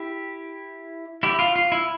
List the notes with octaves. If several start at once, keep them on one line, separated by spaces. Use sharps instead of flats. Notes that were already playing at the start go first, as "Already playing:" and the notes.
Already playing: E4 G4
E4 G4
F4
F4
E4